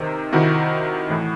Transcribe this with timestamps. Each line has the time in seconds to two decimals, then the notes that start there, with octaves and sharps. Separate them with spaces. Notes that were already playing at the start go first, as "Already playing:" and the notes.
Already playing: C3 D#3
0.33 C3 D#3 E4 F#4
1.09 A2 E3